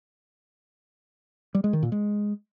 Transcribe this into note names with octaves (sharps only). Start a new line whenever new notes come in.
G3
G#3
D#3
A#2
G#3